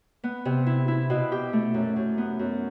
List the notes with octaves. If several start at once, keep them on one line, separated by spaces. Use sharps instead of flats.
B3
C3
E4
E4
B2
G4
A3
F#2
F#2
B3
F#2